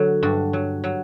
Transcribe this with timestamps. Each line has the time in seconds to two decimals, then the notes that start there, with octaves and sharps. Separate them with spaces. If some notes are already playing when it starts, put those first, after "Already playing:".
Already playing: D3 F#3
0.23 G2 F#4
0.53 F#3
0.84 F#3